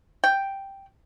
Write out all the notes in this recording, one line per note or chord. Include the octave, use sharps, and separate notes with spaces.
G5